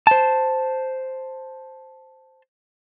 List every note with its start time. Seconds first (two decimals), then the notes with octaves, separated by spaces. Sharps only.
0.07 C5 A5